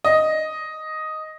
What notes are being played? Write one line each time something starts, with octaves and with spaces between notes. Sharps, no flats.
D#5